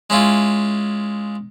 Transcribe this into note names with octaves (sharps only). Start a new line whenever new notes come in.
G#3 C#4 E4 F4